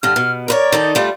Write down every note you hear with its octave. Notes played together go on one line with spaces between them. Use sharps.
G2 D3 F6
B2
A#4 B4 C#5 D5
D#3 D#4 A4
G3 A3 F4